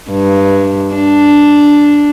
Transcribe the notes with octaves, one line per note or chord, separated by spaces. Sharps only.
G2
D4